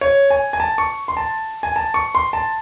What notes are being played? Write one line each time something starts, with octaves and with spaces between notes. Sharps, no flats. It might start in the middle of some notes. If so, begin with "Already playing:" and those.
C#5
G#5
G#5
A5
C#6
C6
A5
G#5
A5
C#6
C6
A5